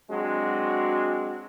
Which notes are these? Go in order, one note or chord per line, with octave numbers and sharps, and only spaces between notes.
F#3 G#3 C4 D4 F#4